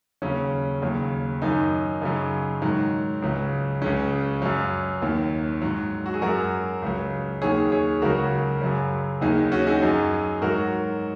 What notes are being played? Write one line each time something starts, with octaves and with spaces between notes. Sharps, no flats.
D#2 C#3 F#3 C#4
D#2 C#3 F#3
F#2 D#3 F#3 D#4
F#2 C#3 F#3
G#2 D#3 F#3
C#2 C#3 F#3
C#2 C#3 F#3 C#4
F#2 F#3
D#2 D#3 F#3
G#2 F#3
F#4
G#4
F#2 F#3 F#4 A#4
C#2 C#3 F#3
D#2 D#3 F#3 G#4 C#5
G#4 C#5
C#2 C#3 F#3 F#4 A#4
F#2 C#3 F#3
D#2 D#3 F#3 D#4 G#4
D#4
C#4 F#4
D#4 G#4
F#2 F#3
G#2 F#3 F#4 A#4